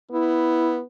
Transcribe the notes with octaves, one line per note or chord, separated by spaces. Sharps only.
B3 E4